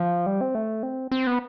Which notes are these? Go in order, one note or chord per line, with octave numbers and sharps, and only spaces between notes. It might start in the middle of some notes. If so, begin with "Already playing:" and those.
Already playing: F3
G3
C4
A3
C4
C4
B3